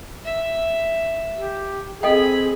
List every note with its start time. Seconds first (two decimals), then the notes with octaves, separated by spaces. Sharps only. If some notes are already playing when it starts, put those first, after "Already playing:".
0.25 E5
1.38 G4
2.03 C4 G#4 A4 D#5 G5 B5